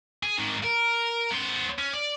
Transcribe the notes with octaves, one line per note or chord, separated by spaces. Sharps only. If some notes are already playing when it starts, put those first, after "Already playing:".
G#4
G#2 D#3
A#4
B3 C5
C#4
D5